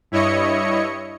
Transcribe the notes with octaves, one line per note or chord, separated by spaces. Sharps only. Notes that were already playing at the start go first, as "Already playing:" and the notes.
G2 E4 C#5 D#5 C#7